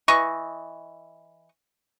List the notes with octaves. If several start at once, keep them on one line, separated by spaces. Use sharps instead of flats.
E3 D#5 C#6